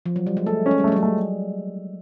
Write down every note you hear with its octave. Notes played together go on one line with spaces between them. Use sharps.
F3
F#3
G3
G#3
A3 A4
C#4
G#3
G3
G#3 A3
F#3
G3
A3